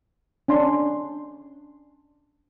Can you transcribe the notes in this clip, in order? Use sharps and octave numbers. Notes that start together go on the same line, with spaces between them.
C#4 D4 C6